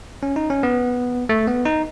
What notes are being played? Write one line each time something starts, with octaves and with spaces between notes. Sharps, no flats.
C#4
D#4
C#4
B3
A3
B3
D#4